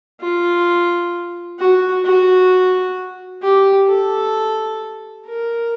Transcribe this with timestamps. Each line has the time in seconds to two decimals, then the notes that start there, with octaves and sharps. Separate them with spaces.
0.21 F4
1.59 F#4
2.05 F#4
3.42 G4
3.88 A4
5.26 A#4